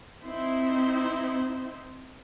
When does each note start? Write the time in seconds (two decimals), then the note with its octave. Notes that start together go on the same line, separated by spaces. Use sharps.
0.24 C4 D#4 E4 C5